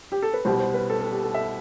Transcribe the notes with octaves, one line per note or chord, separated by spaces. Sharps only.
G4
A4
B4
C2 B2 G3 C5
C5
B4
A4
A4
G4
A4
E5